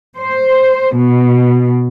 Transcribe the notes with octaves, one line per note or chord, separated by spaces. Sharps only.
C5
B2